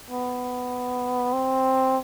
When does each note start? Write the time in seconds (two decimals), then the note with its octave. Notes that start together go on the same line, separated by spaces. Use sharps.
0.10 B3
1.33 C4